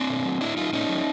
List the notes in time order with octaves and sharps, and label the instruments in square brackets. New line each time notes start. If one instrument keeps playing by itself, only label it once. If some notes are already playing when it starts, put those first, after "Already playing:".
Already playing: [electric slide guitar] C4 D4
B2
F#3
A2 D4 E4
F#3 D#4 F4
A2 C#4 D#4
F#3